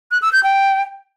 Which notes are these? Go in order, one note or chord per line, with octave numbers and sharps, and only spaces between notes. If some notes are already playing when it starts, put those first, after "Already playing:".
F#6
E6
G6
G5